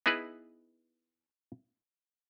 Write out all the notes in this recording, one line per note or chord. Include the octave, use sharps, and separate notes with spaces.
B3 D#4 E4 G#4 B4